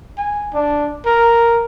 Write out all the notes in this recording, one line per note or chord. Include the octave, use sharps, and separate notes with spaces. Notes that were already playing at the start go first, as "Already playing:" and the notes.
G#5
D4
A#4